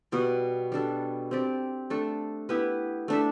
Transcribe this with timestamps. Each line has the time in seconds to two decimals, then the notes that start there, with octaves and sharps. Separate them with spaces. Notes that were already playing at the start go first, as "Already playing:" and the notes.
0.12 B2 G3 B3 F#4
0.72 G3 D4 A4
1.31 C4 G4 D5
1.90 A3 D4 A4
2.49 B3 E4 G4 B4
3.08 A3 D4 A4 E5